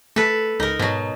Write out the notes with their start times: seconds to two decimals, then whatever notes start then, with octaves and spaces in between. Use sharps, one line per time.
0.16 A3 A4 B4
0.60 C#2 D#4 A#4
0.79 G#2 B2 F#3